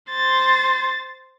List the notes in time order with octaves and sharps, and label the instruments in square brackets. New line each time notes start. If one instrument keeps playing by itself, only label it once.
[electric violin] C5 A6